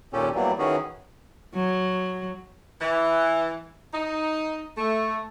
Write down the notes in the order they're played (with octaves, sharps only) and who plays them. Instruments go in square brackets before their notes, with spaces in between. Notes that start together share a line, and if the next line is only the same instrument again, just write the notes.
[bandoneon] D#2 A#2 C#4 G4 A4
E2 E3 F#3 G3 A#3
D#3 E3 C#4 F#4 G#4
[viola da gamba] F#3
[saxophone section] E3
D#4
A3